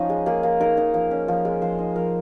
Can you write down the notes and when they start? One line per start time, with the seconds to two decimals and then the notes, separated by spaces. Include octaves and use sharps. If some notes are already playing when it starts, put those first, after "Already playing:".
Already playing: F3 C#4 D#4
0.09 G#3
0.26 A#3 G#4
0.43 A#3
0.60 D#4 A#4
0.77 D#4
0.94 F3
1.11 C#4
1.28 F3
1.45 G#3
1.61 F3 C5
1.78 D#4
1.95 F3 A#4